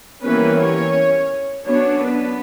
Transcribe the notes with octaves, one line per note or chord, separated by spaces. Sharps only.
E3 G3 A#3 B3 C#4 B4
C#4 C#5
F#3 B3 C#4 D4 C#5
B3 B4